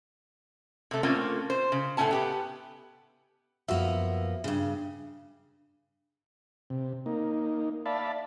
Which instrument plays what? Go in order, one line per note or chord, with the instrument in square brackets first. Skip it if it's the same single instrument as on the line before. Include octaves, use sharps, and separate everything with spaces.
[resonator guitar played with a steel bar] C3 A3
A3 A#3 C4 C#4 F4
C5
C#3
A2 A3 B3 C#4 G#5 A5
B3 G4 B4
[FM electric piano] F#2 F#4 E5 [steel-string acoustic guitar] F3 A#3 B3
[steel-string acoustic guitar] G2 C#3
[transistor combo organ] C3
A#3 D#4
D5 E5 F5 A5 B5